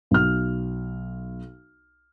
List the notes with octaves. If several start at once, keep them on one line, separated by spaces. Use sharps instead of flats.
B1 F6